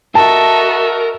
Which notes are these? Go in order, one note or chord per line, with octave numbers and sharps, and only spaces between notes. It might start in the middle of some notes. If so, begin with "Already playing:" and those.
F#4 A4 A#4 D#5 E5 A5